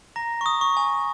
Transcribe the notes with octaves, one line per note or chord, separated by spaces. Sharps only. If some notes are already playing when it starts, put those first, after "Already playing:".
A#5 A#6
C#6
D#6
C#6
G#5